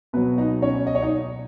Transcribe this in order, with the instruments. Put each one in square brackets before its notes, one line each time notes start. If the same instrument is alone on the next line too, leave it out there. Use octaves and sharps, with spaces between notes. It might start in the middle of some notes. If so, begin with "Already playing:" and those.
[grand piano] B2 F#3 B3 B4
D#4 D#5
C#4 C#5
D#5
C#5
D#4 D#5